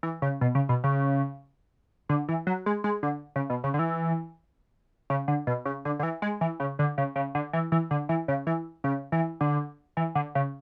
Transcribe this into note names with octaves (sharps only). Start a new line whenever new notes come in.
E3
C#3
B2
C#3
B2
C#3
D3
E3
F#3
G#3
G#3
D3
C#3
B2
C#3
D3
E3
C#3
D3
B2
C#3
D3
D3
E3
G#3
E3
C#3
D3
C#3
C#3
D3
E3
E3
D3
E3
C#3
E3
C#3
E3
D3
E3
D3
C#3